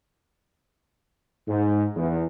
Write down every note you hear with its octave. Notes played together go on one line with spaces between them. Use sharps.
G#2
E2